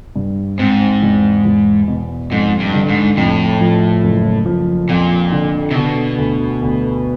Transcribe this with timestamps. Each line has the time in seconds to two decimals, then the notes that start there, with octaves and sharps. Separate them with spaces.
0.16 G2
0.59 G#2 C4
1.02 E2
1.45 E2
1.88 B2
2.31 F2 G#2
2.60 G2
2.74 D3
2.89 G#2
3.17 F2 A2
3.61 F3
4.03 F#1
4.46 F3
4.89 F2 A#2
5.32 D3
5.71 C3
5.75 B2 D3
6.18 D2
6.62 D2